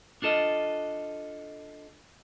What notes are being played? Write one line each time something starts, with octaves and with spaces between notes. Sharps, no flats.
D4 F4 A4 D#5